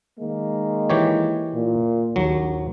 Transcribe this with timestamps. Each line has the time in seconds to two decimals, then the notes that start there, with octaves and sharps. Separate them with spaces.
0.20 D#3 G#3 A#3
0.90 E3 G4 C#5
1.54 A#2
2.16 A#1 D#2 F#3